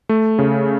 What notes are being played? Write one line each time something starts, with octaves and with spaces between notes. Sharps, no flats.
A3
C#3